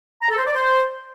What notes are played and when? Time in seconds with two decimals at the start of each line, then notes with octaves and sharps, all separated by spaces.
0.22 A#5
0.30 A4
0.38 C5
0.46 D5
0.54 C5